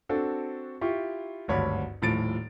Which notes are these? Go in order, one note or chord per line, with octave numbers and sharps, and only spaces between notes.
C4 D4 F#4 A4
E4 F4 G4 C#6
G#1 D2 G2 C#5 D5 B5
D#1 A2 F3 A6 D7